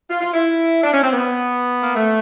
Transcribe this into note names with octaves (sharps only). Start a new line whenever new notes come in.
F4
F4
E4
D4
C#4
C4
B3
A#3
A3